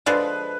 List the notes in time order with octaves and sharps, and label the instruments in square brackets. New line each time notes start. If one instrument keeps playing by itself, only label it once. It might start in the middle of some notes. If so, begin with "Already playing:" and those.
[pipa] D3 F3 G#3 [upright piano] B4